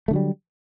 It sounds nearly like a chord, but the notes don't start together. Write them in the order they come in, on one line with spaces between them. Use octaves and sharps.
A3 D3 F#3 G3